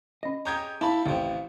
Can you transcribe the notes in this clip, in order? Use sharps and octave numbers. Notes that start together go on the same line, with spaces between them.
C#4 D#5 A#6
G4 G#4 C#5 A#5 G6 G#6
A#3 E4 A5 B5
A1 C3 F3 G5